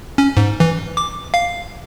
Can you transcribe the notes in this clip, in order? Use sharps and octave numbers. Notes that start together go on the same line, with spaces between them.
C#4
G#2
E3
D6
F5